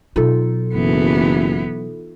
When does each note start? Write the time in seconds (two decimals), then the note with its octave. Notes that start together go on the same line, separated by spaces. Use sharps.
0.16 B2 F#3 D#4 F4 A4
0.74 F#1 E3 B3